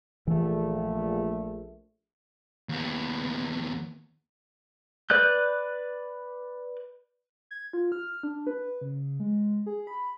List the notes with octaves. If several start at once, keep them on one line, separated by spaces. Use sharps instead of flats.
A#1 E3 A3
D#2 B3
B4 D5 F#6 G6
G#6
F4
F6
D4
B4
C#3
G#3
G#4
B5